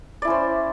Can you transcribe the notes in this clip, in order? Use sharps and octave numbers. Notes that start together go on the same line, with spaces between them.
C#4 E4 C5 D5